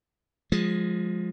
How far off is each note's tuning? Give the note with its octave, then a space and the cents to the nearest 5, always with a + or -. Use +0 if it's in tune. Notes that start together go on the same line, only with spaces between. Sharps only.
F3 +20 G#3 +0